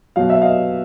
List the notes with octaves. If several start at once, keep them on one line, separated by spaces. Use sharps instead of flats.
B2 F#3 F5
E5
D#5 F5